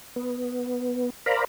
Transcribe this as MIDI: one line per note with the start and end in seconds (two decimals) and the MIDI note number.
0.16 1.10 59
1.26 1.44 70
1.26 1.44 72
1.26 1.44 74
1.26 1.44 77
1.26 1.44 82
1.26 1.44 83